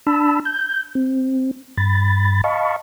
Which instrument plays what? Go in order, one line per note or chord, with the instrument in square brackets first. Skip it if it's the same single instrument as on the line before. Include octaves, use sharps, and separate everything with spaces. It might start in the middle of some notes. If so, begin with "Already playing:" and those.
[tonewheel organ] D4 A5 B5 E6
G6
C4
G2 B5 A6
D#5 F5 A5 B5 C#6